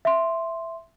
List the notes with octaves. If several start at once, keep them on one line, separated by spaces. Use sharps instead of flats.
E5 C6